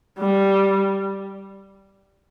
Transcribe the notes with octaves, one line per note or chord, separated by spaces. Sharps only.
G3